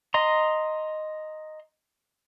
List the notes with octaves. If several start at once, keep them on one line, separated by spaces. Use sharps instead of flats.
D#5 A#5 C6